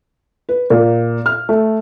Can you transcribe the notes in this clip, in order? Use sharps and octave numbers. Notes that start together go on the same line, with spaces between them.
B4
A#2
F6
A3